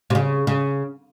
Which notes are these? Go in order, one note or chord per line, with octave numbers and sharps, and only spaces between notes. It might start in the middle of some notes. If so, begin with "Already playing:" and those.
C3
C#3
C#3